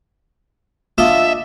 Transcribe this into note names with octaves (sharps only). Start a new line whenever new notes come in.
D4 F4 D#5 E5